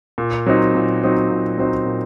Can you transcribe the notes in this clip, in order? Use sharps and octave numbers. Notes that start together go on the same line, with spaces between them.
A#2
F#3 C4 D#4
A#2
F#3 C4 D#4
A#2
F#3 C4 D#4
A#2